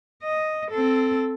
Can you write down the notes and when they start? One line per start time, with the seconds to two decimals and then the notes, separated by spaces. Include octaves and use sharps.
0.23 D#5
0.71 C4 A4